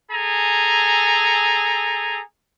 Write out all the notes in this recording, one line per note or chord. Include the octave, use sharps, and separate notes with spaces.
G#4 A4 G#5 A#5